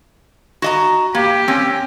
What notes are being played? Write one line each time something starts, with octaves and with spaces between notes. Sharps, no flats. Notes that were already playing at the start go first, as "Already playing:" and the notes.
F#4 D#5 A#5
A#3 G4
C4 C#4